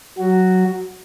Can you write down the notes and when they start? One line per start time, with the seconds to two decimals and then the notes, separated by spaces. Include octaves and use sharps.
0.18 F#3 F#4